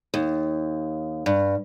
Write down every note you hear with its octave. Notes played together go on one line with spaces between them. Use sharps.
D#2
G2